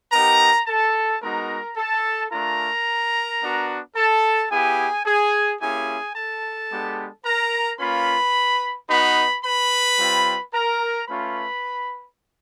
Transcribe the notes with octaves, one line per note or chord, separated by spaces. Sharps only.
B3 D#4 G4 A#4 A#5
A4 A5
G#3 B3 D#4 F#4 A#4 A#5
A4 A5
A3 D4 F4 A#4 A#5
B3 D4 F#4
A4 A5
B3 E4 G4 G#4 G#5
G#4 G#5
A#3 C#4 E4 G4 G#4 G#5
A4 A5
G#3 B3 D4 G4
A#4 A#5
A#3 C#4 F4 B4 B5
B3 D#4 F#4 B4 B5
B4 B5
G3 C4 F4
A#4 A#5
A3 C#4 F4 B4 B5